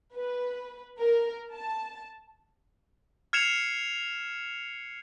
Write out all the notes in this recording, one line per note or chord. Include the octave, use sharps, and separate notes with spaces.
B4
A#4
A5
F6 G#6 C7 C#7 E7 F7